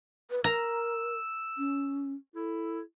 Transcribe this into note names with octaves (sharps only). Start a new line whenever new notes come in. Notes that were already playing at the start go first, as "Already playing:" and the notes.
B4
A#4 A#5 E6
C#4
E4 A4